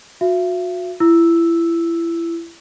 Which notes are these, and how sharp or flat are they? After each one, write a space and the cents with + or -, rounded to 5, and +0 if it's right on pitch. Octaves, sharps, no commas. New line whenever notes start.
F#4 -35 E5 +40
E4 +30 E6 +0